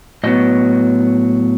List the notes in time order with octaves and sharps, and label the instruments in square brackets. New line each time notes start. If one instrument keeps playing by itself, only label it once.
[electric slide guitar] A2 F#3 B3 D#5